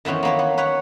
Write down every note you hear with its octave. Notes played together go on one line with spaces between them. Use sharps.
D#3 E3 B3 C#4 C5
A#3 B3 C#5
B3
B4 C#5 F#5